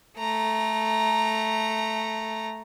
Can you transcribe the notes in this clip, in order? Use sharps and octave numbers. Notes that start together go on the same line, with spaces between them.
A3 A#5